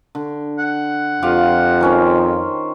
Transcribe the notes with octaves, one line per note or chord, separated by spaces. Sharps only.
D3
F#5
F2 F4 G4 F5
D#3 C#4 C5